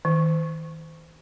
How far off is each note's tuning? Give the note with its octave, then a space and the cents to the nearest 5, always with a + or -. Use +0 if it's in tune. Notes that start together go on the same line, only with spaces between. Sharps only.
D#3 +40